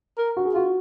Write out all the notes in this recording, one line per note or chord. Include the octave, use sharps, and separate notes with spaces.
A#4
F#4
G#4
F4 F#4